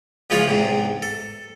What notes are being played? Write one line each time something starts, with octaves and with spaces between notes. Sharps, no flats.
C#2 E3 F3 G#3 F4 C#5
E2 G#2 C3
A4